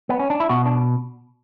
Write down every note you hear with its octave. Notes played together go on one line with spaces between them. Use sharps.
B3
C#4
D4
E4
B2 F#4
D4